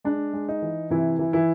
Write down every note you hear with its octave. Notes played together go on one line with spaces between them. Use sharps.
G#3 D4
G#3
D#4
E3
C3 E3 E4
E3
E3 E4